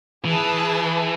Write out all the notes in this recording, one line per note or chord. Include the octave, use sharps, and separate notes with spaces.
E3 G#4 B4 A5